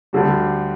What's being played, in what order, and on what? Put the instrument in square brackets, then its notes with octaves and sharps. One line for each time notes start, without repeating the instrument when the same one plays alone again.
[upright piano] D2 D3 G3